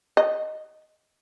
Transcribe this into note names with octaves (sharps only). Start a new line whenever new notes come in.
D#5